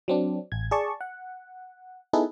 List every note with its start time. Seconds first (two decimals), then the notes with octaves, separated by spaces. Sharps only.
0.08 F#3 C4 D4
0.52 A1 G#6
0.71 G#4 D5 A5 C#6
1.01 F#5
2.13 B3 D#4 E4 G#4 A4 B4